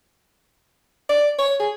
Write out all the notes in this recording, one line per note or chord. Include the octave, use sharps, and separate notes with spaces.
D5
C#5
G#4